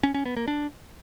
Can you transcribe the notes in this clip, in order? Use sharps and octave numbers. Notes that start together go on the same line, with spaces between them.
C#4
C#4
B3
A#3
D4